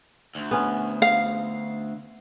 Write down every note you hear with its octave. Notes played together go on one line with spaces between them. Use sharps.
D2
B3 C#4
F5